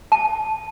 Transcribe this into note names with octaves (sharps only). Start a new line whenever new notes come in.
A5